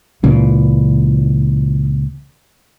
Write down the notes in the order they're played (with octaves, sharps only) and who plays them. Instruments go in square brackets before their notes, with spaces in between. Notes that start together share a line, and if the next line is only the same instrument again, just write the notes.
[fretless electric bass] C#2 A#2 [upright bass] E3